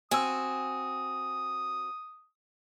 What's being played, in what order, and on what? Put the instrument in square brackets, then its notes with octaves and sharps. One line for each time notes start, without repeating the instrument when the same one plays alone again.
[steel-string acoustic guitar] C4 F#4 [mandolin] G#5 E6 [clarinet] D#6